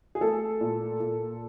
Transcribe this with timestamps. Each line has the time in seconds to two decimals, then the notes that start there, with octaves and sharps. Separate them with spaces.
0.15 G#4
0.21 A3 A4
0.61 A#2
1.00 A#2